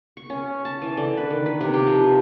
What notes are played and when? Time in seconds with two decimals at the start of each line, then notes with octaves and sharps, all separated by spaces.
0.17 C#6
0.30 C#4
0.65 A5
0.82 E3
0.97 D3
1.17 B4
1.31 D#3
1.46 B4
1.61 C3
1.74 G4
1.87 F3